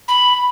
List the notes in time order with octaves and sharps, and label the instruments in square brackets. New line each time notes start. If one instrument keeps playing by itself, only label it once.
[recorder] B5